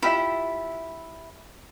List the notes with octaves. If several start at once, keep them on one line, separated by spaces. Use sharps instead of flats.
E4 F4 G4 E5